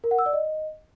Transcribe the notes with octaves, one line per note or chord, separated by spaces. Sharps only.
A#4
F#5
E6
D5
D#5